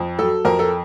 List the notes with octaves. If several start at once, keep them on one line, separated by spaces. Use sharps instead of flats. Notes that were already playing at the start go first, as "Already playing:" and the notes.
Already playing: F2
F#3 A4
F2 A#4
A4